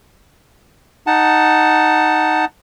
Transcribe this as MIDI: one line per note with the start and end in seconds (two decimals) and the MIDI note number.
1.07 2.45 63
1.07 2.45 78
1.07 2.45 81